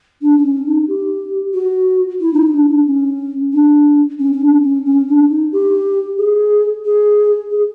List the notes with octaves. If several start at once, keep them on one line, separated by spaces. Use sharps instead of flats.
D4
D4
C#4
D#4
G4
F#4
E4
D4
D#4
D4
D4
C#4
D4
C#4
C#4
D4
C#4
C#4
D4
D#4
G4
G#4
G#4
G#4